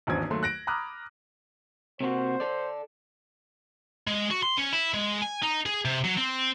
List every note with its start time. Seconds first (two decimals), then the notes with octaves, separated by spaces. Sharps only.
0.07 D#1 G#1 E2 C#4 D4 G#6
0.30 D#2 F#3 A3 C6
0.43 F#6 A#6 D7
0.67 A#5 B5 D6 D#6 F6 F#6
2.00 C3 A#3 F#4 C5
2.40 A4 D5
4.08 G#3
4.31 F#4
4.43 C6
4.57 C#4
4.72 E4
4.94 G#3
5.22 G#5
5.43 D#4
5.66 G#4
5.85 C3
6.04 F#3
6.17 C4